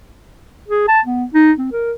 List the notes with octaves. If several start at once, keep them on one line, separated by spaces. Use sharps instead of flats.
G#4
A5
B3
D#4
C4
A#4